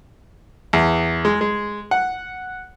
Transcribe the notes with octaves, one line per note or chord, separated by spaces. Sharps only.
E2
G#3
G#3
F#5